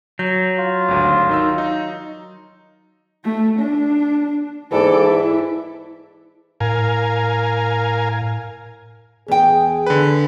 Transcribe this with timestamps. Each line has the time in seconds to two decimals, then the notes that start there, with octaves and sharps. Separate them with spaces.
0.19 F#3 G6
0.60 F4
0.88 G#1 D2
1.29 D#3 D#4 E6
1.58 D#4
3.25 A3
3.59 D4
4.72 G#2 E3 A4 D5
5.06 E4
6.60 A2 A#4 F5 G#5
9.28 E2 G#4 G5
9.86 D3 B4